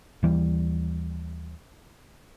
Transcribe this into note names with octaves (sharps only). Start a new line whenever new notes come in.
D#2 E3 G3